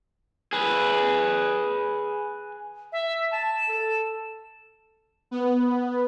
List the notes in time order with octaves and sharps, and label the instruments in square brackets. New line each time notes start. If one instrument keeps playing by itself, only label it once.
[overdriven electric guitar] G#4 B4
[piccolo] E5
[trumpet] A5 [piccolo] E7
[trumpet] A4
[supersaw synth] B3